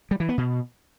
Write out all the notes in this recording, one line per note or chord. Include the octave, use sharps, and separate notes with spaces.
G3
E3
B3
B2